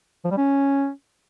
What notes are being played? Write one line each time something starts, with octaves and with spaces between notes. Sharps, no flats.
F3
G3
C#4